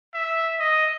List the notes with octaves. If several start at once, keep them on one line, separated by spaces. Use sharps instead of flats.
E5
D#5